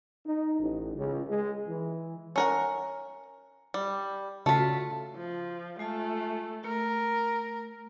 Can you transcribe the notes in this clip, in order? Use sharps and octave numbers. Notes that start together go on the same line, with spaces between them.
D#4
A1
C#2
G#3
E3
C#4 A#4 F#5
G3
C#3 A3 F4 F#4 B6
F3
G#3 A3 F4 A5
A3 A#4